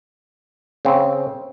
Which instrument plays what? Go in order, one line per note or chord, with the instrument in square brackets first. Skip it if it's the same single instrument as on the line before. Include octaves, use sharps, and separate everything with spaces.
[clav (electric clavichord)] C#3 C4